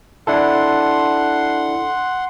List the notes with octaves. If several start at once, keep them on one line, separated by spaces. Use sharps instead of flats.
D4 E4 A4 F#5 C6